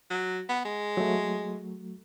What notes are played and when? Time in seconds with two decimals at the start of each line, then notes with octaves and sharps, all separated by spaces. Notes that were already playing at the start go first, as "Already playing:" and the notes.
0.10 F#3
0.49 B3
0.65 G#3
0.97 F#3 A3